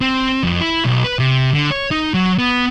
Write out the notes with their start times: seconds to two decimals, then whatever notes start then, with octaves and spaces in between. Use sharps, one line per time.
0.01 C4
0.43 F2
0.61 E4
0.85 B1
1.04 B4
1.19 C3
1.54 D3
1.71 C#5
1.91 D#4
2.14 F#3
2.39 B3